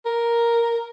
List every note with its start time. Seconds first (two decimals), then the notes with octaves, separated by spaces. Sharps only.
0.05 A#4